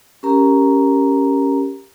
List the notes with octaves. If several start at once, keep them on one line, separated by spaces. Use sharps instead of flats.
C#4 G4 A#4 A#5